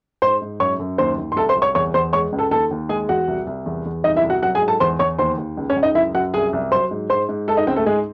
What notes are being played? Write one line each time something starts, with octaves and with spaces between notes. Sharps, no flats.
G#2 C5 C6
G#2
F#2 C#5 C#6
F#2
D#2 C5 C6
D#2
C6
C2 A4 A5
C5 C6
C2
C#5 C#6
E2 C#5 C#6
E2 C5 C6
G#3 C#5 C#6
C#2
A4 A5
D#2 A4 A5
D#2
G#3 G#4 G#5
E2 F#4 F#5
C2
C2
E2
E2
C2 D#4 D#5
E4 E5
C2
F#4 F#5
F#3 F#4 F#5
G#4 G#5
G#2
A4 A5
E2 C5 C6
E2 C#5 C#6
D#2 C5 C6
D#2
C#2
C#4 C#5
C#2
D#4 D#5
F#2 E4 E5
F#2 F#4 F#5
C2 G#4 G#5
C2
F#3 C5 C6
G#2
G#2 C5 C6
G#2
G#3 A4 A5
D#4 D#5
C#2 C4 C5
A3 A4
G#2 G#3 G#4